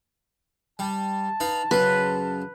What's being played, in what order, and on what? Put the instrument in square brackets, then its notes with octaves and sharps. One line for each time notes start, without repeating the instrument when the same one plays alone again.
[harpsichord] G3 [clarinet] A5
[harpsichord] D#4 B4 F5
[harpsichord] F#2 C#3 C6 [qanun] B4